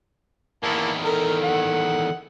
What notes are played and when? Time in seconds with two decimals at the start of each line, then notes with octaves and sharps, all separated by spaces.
0.64 E2 D#3 A#3 E4 A5
1.05 A4 A#4
1.44 F#5